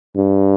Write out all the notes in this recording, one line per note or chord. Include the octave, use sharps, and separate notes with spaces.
G2